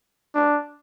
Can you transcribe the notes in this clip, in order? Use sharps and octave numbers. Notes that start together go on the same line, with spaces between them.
D4